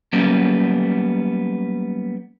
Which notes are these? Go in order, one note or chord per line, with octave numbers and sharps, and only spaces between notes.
F#3 G3 A#3 B3 C#4